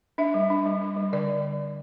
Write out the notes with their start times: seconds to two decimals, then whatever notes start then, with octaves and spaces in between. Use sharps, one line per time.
0.18 D4 E5
0.34 G3
0.50 D4
0.66 G3
0.81 D4
0.97 G3
1.13 D3 D5